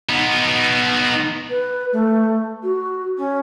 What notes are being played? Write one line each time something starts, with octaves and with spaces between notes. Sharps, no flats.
B3 D#4
B4
A3
F#4
C#4